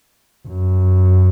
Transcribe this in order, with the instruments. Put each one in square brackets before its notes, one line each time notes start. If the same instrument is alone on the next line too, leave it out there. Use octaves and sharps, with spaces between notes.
[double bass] F#2